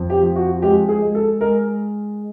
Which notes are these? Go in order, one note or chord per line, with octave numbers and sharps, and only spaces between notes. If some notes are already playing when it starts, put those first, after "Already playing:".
Already playing: F2
G4
F3
F#4
G#3 G4
G#4
G#3
A4
G#3 A#4